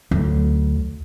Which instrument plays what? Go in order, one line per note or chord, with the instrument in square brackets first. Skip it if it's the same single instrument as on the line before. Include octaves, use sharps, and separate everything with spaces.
[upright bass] D2 F#3